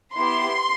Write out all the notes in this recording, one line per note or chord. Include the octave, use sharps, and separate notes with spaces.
B3 E4 G4 C6